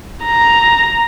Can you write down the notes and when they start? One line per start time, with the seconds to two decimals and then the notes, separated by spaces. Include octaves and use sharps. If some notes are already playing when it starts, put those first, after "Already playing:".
0.24 A#5